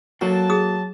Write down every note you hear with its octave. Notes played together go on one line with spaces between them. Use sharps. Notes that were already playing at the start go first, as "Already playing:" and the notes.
F#3 A#3 F#4 A4 A5
G#4 D#6